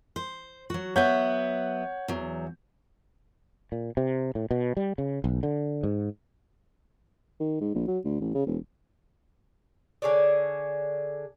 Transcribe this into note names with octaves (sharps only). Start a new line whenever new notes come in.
C5
F#3 F#4
F#3 B3 C#5 E5 F#5 G6
E2 F#3
A#2
C3
A2
B2
G3
C#3
B1
D3
G#2
D#3
G#2
A#1
F#3
D2
A1
C#3
E1
D3 G#4 C#5 D5